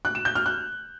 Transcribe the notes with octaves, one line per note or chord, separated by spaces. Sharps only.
F#6
E7
G6
F6
F#6